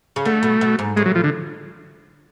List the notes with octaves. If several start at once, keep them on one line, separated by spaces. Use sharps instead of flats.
C#3
D3 A3
B2
B2
G#2
A2 G#3
F#3
F3
D3